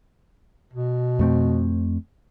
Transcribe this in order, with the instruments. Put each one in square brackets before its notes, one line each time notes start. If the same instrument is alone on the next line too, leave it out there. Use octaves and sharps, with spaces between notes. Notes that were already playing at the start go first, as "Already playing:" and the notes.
[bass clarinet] B2
[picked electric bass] F2 A3 C4